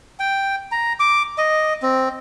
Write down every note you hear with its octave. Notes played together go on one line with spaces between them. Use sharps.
G5
A#5
D6
D#5
C4